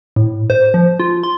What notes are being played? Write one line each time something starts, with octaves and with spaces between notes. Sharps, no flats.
A2
C5
F3
F4
C6